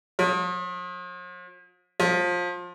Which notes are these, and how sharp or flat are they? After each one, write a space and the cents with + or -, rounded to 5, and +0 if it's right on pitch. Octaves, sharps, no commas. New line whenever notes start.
F3 +45
F3 +25